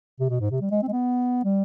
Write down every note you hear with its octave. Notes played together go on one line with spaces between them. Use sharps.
C3
B2
G#2
C3
G3
G#3
C4
G#3
B3
G3